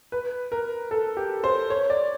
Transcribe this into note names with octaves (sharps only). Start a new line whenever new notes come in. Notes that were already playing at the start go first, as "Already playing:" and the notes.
B4
A#4
A4
G4
C5
C#5
D5